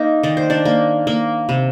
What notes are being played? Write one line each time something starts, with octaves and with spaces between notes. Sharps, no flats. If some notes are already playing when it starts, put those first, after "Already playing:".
Already playing: A#3 D#4
D#3 D5
C5
D4 D5
A#3
A#3
C3